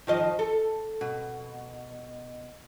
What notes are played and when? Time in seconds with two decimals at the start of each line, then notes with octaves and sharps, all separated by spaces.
0.07 D#3 F3 D#5
0.39 A4
1.01 B2